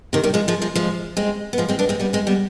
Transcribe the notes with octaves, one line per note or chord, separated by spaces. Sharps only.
C3 D#3
D#3 G3
F3 G#3
F3 G#3
F3 G#3
F3 G#3
G#3 C4
B3
F3 G#3
G#3 C4
B3 D4
G#3 C4
G3 B3
G#3 C4
G3 B3